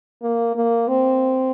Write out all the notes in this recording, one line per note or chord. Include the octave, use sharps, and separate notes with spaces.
A#3
A#3
C4